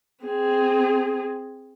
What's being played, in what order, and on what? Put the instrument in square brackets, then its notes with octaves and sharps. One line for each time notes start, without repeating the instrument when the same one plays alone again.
[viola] C4 G#4